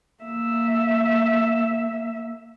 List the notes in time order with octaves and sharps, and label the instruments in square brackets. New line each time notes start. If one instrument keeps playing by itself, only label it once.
[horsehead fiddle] A#3 E5